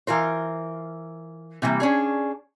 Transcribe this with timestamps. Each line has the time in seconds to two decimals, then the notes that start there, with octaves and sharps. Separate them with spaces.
0.07 E3 F4 A#4 C5
1.62 C3 E3 G3 A#3
1.80 C#4 D4 G#4